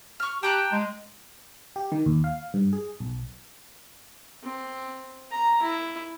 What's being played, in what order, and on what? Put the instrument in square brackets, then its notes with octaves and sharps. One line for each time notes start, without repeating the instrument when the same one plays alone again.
[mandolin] C#6 F6
[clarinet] G4 [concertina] G5 [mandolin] A5 A#5 F#6
[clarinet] G#3
[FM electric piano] G4
D#3
D#2
F5
G2
G#4
B1
[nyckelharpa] C4
A#5
E4